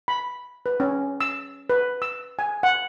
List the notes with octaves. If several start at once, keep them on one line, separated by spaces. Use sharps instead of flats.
B5
B4
C#4
E6
B4
E6
G#5
F#5